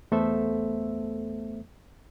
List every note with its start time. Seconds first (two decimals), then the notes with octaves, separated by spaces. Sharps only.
0.12 E2 A3 B3 A4 C5 E5